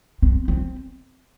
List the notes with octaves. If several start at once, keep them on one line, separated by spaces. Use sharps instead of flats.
C4
C4